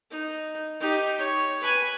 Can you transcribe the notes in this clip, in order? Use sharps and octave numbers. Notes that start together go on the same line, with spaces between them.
D#4
D#4 G4
C#5
B4 G#5